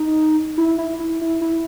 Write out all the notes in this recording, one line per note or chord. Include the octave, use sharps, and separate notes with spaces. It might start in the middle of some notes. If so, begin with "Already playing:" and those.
Already playing: D#4
E4
E4
E4
E4
E4